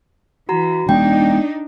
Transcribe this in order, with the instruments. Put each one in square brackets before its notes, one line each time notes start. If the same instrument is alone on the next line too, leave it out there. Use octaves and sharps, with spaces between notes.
[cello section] E3 [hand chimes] F#4 A#5
[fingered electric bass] G#3 B3 [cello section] D4 D#4 [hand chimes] G5